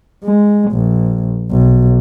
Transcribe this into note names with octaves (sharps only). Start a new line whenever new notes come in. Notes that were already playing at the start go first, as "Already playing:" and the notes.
G#3
A#1
B1